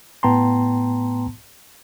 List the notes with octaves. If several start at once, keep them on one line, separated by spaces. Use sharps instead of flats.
A2 B3 G5 A5 A#5 C6